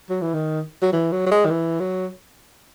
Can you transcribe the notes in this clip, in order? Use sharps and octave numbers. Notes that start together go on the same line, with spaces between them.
F#3
E3
D#3
F#3
E3
F#3
F#3
G#3
D#3
E3
F#3